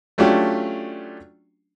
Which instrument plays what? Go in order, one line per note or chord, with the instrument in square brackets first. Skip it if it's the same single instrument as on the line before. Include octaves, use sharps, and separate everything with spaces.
[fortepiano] F#3 A3 C#4 D4 F4 G4